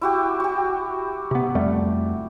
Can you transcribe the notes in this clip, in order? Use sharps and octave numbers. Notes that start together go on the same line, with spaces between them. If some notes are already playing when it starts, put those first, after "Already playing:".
E4 F#4 G4
F#4 G4
C3 B3
F2 G3 A3